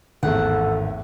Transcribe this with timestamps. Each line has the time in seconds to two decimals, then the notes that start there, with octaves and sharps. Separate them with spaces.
0.23 G#1 E2 A2 A4 F#5